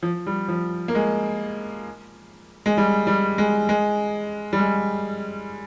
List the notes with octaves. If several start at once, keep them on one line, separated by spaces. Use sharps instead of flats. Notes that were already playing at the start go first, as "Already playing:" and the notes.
F3
G3
F3
A#3
G#3
G#3
G3
G3
G#3
G#3
G3
G#3